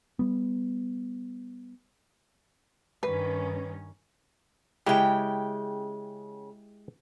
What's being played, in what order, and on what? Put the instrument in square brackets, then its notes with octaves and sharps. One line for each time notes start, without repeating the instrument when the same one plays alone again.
[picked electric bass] G3 B3
[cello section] G2 D#3 C#4 [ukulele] B4
[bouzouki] C#3 G5 [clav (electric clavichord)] G#3 E4 G4